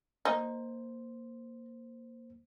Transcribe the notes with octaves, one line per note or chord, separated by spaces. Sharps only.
A#3 D#4 C5